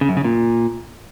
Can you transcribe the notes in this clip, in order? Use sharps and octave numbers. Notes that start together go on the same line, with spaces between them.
C#3
F#2
C#3
A#2